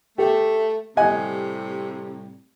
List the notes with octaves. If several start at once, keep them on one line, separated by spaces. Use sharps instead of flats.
A3 G4
A2 C3 G3 D#5 F#5 G#5